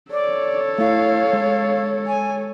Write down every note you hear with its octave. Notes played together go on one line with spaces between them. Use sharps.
A4 C#5 D5
A3 E4 F5
G#3
G#5